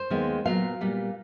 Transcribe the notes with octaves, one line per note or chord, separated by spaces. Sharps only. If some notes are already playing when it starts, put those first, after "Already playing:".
Already playing: C5
D#2 D#3 G#3 B3
A#2 F#3 B3 F5
A#2 G3 B3